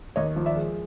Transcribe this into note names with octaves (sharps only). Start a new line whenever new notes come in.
D#2 C#5 D#5
F3
D5 E5
G#3